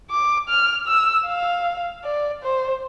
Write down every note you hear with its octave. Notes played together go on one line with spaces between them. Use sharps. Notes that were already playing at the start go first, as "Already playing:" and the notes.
D6
F6
E6
F5
D5
C5